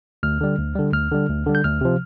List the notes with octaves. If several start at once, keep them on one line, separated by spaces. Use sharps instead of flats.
D2 F6
D3 G3
D2
D3 G3
D2 F6
D3 G3
D2
D3 G3
G6
D2 F6
C3 F3